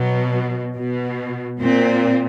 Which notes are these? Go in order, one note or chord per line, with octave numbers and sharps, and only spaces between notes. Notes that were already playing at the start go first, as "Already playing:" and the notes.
Already playing: B2 F#3
B2
A#2 C4